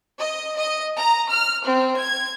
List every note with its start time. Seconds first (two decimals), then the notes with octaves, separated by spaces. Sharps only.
0.19 D#5
0.57 D#5
0.97 A#5
1.30 F6
1.65 C4
1.98 G#6